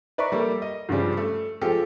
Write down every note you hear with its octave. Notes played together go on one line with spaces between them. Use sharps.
B4 D5 E5 A#5 C#6
G3 A#3 A4
D#5
G2 C#3 F3 G3 G#3
A3
F3 G#3 F4 G4 A4